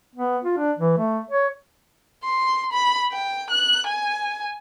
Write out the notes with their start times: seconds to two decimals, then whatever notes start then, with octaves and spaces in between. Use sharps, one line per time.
0.15 B3
0.44 F4
0.57 D4
0.78 E3
0.97 A3
1.30 C#5
2.24 C6
2.73 B5
3.12 G5
3.50 F#6
3.87 G#5